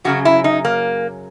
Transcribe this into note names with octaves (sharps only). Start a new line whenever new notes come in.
F#2 C#3 F#3 F#4
E4
D#4
A#3